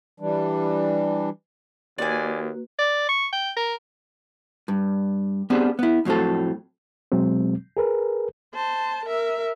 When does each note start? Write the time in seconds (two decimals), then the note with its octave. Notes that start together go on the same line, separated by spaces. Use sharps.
0.20 E3 G3 D4
1.98 D#2 A#3 F#4 B4 D5 G#5
2.79 D5
3.09 C#6
3.33 G5
3.57 A#4
4.68 G2
5.50 B3 C4 D4 G4 G#4
5.79 B3 E4
6.05 F2 A2 F#3 C4 A4
7.12 B2 F#3 G#3 C4
7.77 G#4 A#4 B4
8.54 C5 A5
9.05 A#4 E5